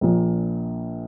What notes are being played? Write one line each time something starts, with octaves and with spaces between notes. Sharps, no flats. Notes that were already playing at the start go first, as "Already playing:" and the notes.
A#1 A#2 F3